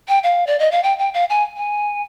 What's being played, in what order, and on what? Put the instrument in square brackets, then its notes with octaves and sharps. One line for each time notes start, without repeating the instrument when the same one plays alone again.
[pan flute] G5
F5
D5
D#5
F5
G5
G5
F5
G#5
G#5